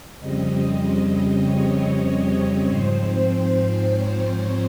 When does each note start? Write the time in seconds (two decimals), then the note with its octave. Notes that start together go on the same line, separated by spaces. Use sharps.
0.20 F2 C#3 G3 C4 D#5
1.43 C#5
2.65 G#2 F3 C4 C5
3.87 C#5